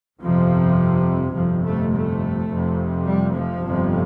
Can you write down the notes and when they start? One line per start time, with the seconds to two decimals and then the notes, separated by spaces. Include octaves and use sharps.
0.20 G1 F2 C3 F3
1.35 G1 F2 C3 F3
1.64 A3
1.92 A3
2.49 F1 F2 C3
3.06 G3
3.35 F3
3.63 G1 F2 C3